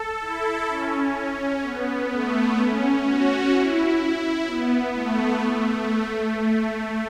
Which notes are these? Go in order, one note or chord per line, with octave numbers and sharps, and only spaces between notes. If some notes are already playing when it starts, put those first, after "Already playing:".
Already playing: A4
E4
C#4
B3
A3
C#4
F#4
E4
B3
A3
A3